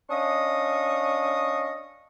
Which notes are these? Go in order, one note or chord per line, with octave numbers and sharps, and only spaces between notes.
C#4 D4 D#5 F5 C#6 D#6